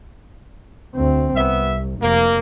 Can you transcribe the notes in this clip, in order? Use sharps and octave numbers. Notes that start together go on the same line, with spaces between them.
D2 C4
C2 B3 E5
F1 A#3